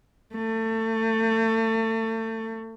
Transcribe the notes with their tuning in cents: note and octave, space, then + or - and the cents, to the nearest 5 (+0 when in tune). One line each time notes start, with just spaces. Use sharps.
A3 +30